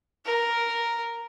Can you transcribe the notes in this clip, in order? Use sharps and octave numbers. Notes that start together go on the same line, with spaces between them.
A#4